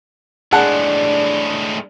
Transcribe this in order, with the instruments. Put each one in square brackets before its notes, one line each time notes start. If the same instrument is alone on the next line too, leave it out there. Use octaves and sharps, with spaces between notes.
[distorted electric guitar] A2 G#3 [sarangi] D4 [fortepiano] G#4 F#5 A5